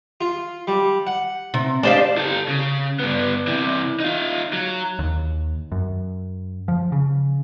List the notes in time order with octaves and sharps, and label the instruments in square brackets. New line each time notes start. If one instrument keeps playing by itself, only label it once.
[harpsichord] F4
G3
F#5
[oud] C3
[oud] D4 G4 F5 [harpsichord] C5 D#5 A5
[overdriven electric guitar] G4 A4
C#3
G2 B3
C3 E3
D#4 F4
F#3
[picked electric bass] D#2
F#2
F3
C#3